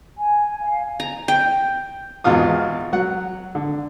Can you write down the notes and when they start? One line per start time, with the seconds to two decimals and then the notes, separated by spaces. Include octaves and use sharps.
0.18 G#5
0.59 F5 G#5
1.00 A#5
1.28 G5
2.24 G#1 E2 B2 F4 F5 D#6
2.93 F#3 F#5
3.55 D3